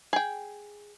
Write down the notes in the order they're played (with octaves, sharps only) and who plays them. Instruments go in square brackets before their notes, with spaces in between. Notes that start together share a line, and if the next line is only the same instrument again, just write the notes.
[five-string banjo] G#4 G5